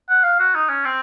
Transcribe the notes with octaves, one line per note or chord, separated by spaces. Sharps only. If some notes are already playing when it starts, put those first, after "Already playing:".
F#5
F5
F#4
D#4
C#4
C4